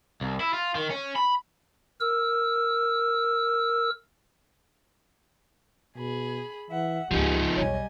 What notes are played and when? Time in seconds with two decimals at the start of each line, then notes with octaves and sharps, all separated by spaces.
0.21 C2
0.40 E4
0.54 F4
0.75 D#3
0.90 C#4
1.16 B5
2.01 A#4 E6
5.97 B2 G#4 B5
6.70 E3 E5 F#5
7.11 C#2 G#2 F3 B3 D#4 G4 G#4
7.57 B1 E2 G3 C#5 D#5 G#5